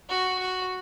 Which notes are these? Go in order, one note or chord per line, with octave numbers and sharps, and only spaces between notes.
F#4
F#4